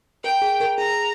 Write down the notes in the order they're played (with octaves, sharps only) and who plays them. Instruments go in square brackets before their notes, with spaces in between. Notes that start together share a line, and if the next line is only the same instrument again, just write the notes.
[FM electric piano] A#4 [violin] G5
[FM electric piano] G#4
A#4
[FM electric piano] G#4 [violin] A#5